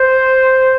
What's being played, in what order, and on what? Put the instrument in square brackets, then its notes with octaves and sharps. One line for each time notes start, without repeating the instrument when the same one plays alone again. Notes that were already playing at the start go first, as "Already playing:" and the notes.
Already playing: [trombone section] C5